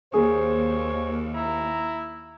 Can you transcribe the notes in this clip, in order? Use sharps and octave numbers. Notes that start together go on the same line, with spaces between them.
D#2 G#4 C5 C#5
E4 A#5